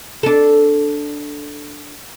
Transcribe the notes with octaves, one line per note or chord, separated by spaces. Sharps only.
D4 A4